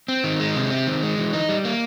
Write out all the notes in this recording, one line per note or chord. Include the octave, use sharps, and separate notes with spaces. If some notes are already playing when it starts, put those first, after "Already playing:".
C4
D#3
G#3
C3
C4
D#3
G#3
E3
D#4
G3
A#3